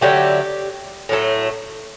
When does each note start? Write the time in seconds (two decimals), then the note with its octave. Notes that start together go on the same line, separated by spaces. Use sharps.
0.01 D3 F#3 A3 G4
1.09 A2 F#3 A3